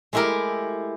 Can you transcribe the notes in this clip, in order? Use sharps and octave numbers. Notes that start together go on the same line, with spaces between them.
G#3 A3 E4 G4 A#4